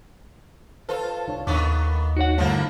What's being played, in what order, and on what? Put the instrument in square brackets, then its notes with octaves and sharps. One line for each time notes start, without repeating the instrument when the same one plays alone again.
[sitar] F4 A4 [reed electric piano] B4 C5
[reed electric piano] C2 D4 C#5
[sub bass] D#2 [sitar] D#3 B3 [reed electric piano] C#6 D6
[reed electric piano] D#4 C#5 [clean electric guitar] F#4 F#5
[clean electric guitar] G2 D3 [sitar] F3 A#3 E4 [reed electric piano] A3